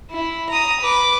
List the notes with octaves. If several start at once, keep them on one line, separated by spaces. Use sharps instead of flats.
E4
A#5 D#6
B4 D6